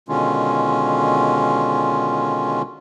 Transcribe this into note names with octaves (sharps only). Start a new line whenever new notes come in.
B2 D3 D#3 G#3 C#4 F4